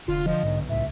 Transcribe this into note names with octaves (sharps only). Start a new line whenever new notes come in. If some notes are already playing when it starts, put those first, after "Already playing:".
F1 D3 F4
F3 D#5
B1 G#2
C#2 A2 E5